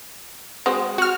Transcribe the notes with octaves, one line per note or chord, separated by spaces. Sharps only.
G#3 C4 F#4
F#4 F6